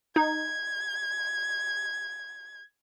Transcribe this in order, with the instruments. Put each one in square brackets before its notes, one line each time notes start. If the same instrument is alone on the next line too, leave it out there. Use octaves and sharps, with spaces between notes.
[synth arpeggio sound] D#4 [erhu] G#6